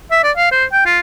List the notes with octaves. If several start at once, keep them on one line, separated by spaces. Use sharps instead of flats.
E5
D5
F5
C5
G5
F4